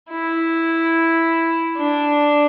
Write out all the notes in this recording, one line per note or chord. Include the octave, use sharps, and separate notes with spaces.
E4
D4